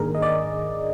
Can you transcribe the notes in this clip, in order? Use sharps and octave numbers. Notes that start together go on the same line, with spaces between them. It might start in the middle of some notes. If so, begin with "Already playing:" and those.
Already playing: G#2 D#3 A#3 D4 G#4 A#4
D#5
D5